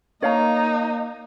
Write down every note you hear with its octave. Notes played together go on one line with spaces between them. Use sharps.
A#3 D#4 C#5 F5 A#5